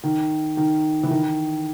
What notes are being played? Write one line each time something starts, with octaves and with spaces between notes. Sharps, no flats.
D#3
D#3
E3
D#3